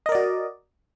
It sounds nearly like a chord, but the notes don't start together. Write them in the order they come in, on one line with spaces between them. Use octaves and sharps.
D#5 A#4 D5 F#4